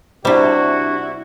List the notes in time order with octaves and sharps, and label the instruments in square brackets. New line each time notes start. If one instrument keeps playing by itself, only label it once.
[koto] C3 G3 [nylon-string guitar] D4 C5 [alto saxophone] E4 [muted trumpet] F#4